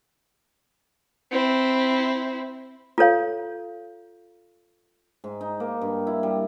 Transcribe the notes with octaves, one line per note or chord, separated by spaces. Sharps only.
C4 E4
F4 A4 C#5 F5
G#2
D#4
A#3
G2
E4
G3